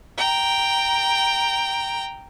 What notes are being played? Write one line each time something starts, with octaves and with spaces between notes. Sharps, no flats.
G5 A#5